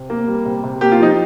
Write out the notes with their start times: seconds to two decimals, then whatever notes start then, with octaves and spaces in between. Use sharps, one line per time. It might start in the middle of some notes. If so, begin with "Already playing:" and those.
Already playing: C3
0.10 A#3
0.27 G3
0.45 C3
0.64 C3
0.81 A#3 G4
0.92 F4
0.99 F3 D#4